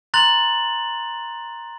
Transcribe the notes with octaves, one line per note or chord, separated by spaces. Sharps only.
A#5 C6 F#6 A6 F7 F#7